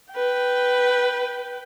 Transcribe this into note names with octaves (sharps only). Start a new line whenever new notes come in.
B4 G5